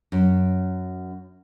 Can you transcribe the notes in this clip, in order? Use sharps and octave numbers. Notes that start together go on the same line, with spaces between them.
F#2